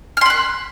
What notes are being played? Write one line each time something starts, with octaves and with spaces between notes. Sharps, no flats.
B5 C6 F6 F#6